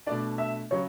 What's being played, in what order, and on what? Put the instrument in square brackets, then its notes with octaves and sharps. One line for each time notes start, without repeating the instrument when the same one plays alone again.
[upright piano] B2 A3 D4 [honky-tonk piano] D5
[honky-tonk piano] E5
[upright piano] C#3 F#3 [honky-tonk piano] C#5